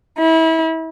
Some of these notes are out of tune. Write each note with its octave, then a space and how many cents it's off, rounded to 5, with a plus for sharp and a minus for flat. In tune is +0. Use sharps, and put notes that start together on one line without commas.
E4 -30